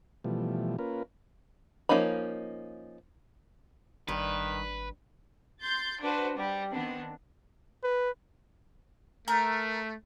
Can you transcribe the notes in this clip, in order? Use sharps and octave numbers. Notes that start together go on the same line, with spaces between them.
B2 E3 F3 G3 A3
A#3 C#4 F4 A#4 B4
F3 A#3 C#4 D#4 B5
G#1 G2 D#3 B4
C6 G6 A6
D4 F#4 B4 C5
G3
D#3 B3 C4 D4
B4
A3 A#4